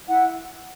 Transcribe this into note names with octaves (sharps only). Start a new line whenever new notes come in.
E4 F#5